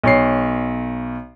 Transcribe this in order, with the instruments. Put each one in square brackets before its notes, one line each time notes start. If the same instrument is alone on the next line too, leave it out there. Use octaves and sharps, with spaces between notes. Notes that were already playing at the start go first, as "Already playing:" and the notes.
[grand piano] B1 C#5 C7